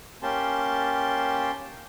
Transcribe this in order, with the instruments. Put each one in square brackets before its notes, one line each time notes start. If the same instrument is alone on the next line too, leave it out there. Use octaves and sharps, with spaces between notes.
[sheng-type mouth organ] A#3 C#4 G4 A5 C6